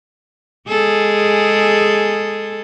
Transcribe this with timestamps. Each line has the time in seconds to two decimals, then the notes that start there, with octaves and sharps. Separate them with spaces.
0.69 G#3 G#4 A4